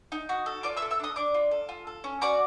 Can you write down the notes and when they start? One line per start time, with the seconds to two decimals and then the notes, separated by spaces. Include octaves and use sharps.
0.12 D#4
0.29 F#4
0.46 A4
0.63 F4 D5 D6
0.77 E5 E6
0.82 A4
0.91 E5 E6
1.00 D4 D#5 D#6
1.16 D4 D5 D6
1.34 F4
1.51 A4
1.69 F4
1.87 A4
2.04 C#4
2.21 F#4 D5 D6